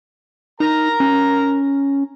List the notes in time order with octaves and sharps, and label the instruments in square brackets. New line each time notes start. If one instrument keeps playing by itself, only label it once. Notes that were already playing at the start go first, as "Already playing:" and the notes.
[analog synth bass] D#4 [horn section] A#4 A#5
[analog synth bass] C#4